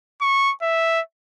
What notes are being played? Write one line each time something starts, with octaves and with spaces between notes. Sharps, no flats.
C#6
E5